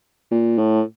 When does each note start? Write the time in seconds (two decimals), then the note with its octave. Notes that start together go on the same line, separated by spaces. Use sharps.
0.31 A#2
0.58 A2